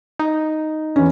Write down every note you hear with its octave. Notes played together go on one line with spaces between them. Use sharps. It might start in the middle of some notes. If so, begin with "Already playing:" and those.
D#4
E2 C#4